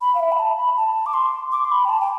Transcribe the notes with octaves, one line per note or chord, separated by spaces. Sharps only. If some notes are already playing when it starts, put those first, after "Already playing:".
B5
F5
E5
B5
A5
B5
A5
D6
C6
D6
C6
B5
G5
A5
G5